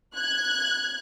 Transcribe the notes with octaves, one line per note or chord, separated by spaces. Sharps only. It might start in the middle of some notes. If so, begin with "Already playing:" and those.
F#6 G#6